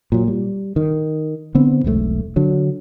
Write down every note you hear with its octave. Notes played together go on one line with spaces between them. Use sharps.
A#2 F#3
G3
D#3
D3 B3 C4
E1 B1 C3 A3
D3 F#3